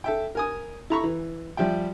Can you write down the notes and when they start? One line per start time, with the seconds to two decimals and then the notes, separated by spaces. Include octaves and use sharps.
0.04 A4 E5 G5
0.35 A#4 G#5 D#6
0.90 E4 A4 A#5 B5 C#6
1.04 E3
1.57 F3 G3 E5 G5